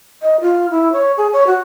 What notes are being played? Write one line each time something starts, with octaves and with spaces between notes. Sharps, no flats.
D#5
F4
E4
C#5
G#4
C#5
F#4